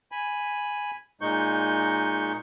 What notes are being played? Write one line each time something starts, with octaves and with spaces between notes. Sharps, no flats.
G#5 B5
A#2 G#3 D#4 C#6 G6